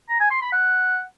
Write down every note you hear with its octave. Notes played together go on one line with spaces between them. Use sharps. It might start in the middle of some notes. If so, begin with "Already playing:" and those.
A#5
G#5
C6
B5
F#5